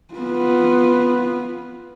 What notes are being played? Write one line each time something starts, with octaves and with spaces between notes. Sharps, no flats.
B3 F4